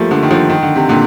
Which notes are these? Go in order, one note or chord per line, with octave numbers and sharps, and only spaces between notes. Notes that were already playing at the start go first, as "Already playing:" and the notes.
Already playing: F3 G3 A3 A#3
D3 F3
D#3
D3 F3
D#3
D3
C3
A#2 D3